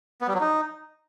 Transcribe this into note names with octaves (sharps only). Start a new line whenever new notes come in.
B3
G3
F#3
D#4